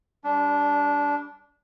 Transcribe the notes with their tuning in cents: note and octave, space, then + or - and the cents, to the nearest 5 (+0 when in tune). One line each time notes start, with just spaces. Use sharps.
G3 +5 D4 -15